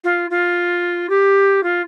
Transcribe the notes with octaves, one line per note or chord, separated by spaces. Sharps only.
F4
F4
G4
F4